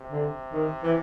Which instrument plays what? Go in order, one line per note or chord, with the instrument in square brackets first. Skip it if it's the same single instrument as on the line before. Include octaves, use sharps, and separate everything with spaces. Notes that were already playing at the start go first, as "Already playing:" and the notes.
Already playing: [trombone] C3
[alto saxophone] D3
D#3
E3